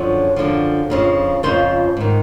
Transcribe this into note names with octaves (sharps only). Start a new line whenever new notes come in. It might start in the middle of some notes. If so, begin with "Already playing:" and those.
Already playing: F#2 D3 F3 C#5
F#2 D3 F3
F2 C#3 F3
F2 C#3 F3 C5
G#2 D#3